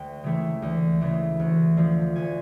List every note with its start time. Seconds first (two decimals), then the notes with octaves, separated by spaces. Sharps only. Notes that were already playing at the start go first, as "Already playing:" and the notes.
Already playing: D2 G5
0.24 C#3 E3 A3
0.62 D2
1.01 C#3 E3 A3
1.40 D2
1.77 D3 F3
2.16 D2 G#5